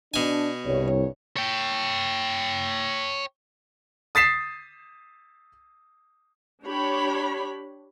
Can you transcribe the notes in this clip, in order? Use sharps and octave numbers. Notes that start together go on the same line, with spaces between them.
B2 D4 G#5
C2 G2 C#5
C#5 G5
D#6 A6 B6 C7 E7
D4 G4 C#5 B5